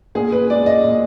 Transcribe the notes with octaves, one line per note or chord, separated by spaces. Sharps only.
A#2 G#4
B4
G#3 D5
D#5
A#2